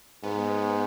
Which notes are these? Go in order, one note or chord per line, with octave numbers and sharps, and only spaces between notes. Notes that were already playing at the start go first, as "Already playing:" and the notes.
G#2 B3